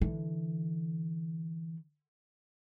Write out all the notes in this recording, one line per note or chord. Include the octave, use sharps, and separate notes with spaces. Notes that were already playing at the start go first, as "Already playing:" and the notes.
D3 E3